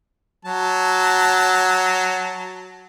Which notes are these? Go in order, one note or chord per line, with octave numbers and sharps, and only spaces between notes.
F#3 A5